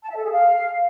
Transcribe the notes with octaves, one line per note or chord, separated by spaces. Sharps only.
A5
E5
A4
G#4
F5